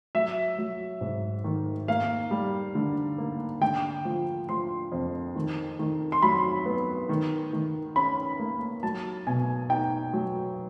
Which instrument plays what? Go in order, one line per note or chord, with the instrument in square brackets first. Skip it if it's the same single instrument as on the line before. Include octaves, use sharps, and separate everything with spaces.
[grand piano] F#3 E5
F#3
G#2
D#3
A#3 F5
G3
D3
A#3
D3 G5
F3
F3 C6
F2
D#3
D#3
C6
F#3 B5
B3
D#3
D#3
C#4 B5
A#3
F#3 A5
B2 G#5
D#4 G5
F#3